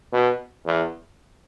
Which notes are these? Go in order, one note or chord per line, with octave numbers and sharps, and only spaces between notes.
B2
E2